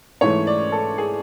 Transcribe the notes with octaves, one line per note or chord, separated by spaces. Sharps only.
G#2 E3 A3 C#5
D5
A4
G#4